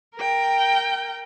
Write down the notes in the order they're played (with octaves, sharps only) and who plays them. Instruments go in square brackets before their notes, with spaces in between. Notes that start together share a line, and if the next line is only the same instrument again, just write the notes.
[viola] A#4 G5